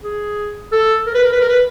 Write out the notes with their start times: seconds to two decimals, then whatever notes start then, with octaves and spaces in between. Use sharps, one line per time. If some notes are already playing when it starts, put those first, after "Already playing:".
0.02 G#4
0.72 A4
1.07 A#4
1.15 B4
1.24 A#4
1.33 B4
1.41 A#4
1.49 B4